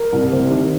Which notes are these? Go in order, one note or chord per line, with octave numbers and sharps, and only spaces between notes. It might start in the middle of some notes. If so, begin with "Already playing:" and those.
Already playing: A#4
C2
C3
D#3